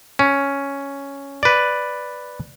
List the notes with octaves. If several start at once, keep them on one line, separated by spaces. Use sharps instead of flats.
C#4
B4 D5